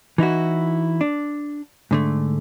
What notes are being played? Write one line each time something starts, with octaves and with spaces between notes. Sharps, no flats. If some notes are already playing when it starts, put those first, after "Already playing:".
E3 D#4 E4 F#4
D4
G#2 D3 A3